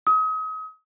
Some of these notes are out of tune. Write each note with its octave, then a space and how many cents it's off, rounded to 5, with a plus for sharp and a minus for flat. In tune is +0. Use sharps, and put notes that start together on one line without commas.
D#6 +35